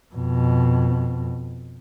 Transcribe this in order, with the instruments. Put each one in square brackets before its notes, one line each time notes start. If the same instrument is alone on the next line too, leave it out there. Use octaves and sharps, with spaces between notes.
[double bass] F2 B2